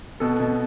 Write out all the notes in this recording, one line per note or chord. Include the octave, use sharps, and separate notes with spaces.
B2 A4
B2